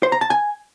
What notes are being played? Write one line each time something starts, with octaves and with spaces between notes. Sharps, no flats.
C5
A#5
A5
G#5